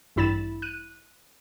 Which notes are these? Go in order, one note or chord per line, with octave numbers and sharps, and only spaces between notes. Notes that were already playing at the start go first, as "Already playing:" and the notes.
A1 G2 E4 B5 A6 E7
F#6 D#7